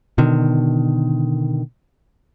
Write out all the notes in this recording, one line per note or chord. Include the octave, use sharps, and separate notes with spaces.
B2 D3 D#3